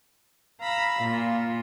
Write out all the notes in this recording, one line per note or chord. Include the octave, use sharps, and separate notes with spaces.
F5 A#5 B5 E6
A#2 F4